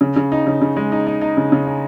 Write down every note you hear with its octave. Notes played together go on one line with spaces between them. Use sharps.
C#3
C#3
D#4
C#3
C#3
G#3
D#4
D#4
D#4
C#3
C#3
D#4